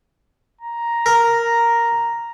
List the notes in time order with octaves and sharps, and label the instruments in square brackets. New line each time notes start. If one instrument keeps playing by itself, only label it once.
[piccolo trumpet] A#5
[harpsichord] A#4